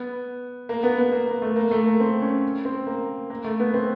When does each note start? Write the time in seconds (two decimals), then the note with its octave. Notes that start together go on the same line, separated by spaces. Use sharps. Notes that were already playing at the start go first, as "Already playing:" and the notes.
Already playing: B3
0.69 A#3
0.83 B3
0.98 B3
1.12 A#3
1.27 A#3
1.42 A3
1.56 A#3
1.71 A3
1.86 A#3
2.00 C4
2.22 C#4
2.65 C4
2.87 A#3
3.30 A#3
3.44 A3
3.60 B3
3.74 C4